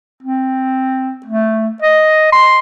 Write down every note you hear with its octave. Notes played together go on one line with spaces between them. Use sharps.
C4
A3
D#5
C6